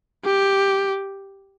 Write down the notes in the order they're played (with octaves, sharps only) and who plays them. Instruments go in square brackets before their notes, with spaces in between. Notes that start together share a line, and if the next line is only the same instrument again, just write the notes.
[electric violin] G4